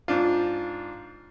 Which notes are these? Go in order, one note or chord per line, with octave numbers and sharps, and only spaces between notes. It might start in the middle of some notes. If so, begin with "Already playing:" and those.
G#2 D4 F4